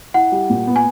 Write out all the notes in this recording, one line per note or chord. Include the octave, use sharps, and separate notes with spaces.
E4 F#5
G3
A#2
B3
G#5